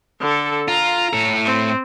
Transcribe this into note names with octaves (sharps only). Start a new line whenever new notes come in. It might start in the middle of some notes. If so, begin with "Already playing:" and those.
D3 A4
F4 A#5
A2 A4
C4